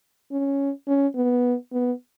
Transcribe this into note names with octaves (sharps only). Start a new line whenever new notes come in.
C#4
C#4
B3
B3